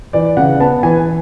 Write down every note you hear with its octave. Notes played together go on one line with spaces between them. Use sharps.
E3 D5
C#3 F#5
B3 A5
E3 G#5